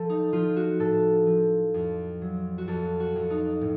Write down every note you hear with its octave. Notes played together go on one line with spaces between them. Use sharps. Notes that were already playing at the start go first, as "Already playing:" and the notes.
Already playing: F3 A4
D#4
F3 F4
F#4
A2 A4
F3
F2
F#3
F#4
F2 A4
F#4
F2
D#4
A2